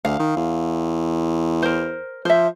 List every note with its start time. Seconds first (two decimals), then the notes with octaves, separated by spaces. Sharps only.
0.05 D2 F5
0.19 D#3
0.37 E2
1.62 A#4 C5
2.25 F3 C5 E5